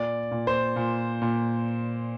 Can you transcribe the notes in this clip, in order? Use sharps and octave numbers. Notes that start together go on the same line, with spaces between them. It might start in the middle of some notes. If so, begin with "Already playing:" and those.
Already playing: A#2 D5
A#2
C5
A#2
A#2